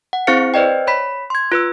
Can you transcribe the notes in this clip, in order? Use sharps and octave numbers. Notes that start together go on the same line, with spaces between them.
F#5
C4 E4 G#4 C5 F5 C#7
B4 C5 D5 D#5 G5
C#5 B5 B6
C6 G#6
F4 B4 E6